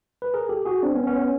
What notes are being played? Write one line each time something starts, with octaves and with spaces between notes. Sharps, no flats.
B4
G#4 A#4
G4 A4
F#4 G#4
C4 D4
B3 C#4
B3 C#4
B3 C#4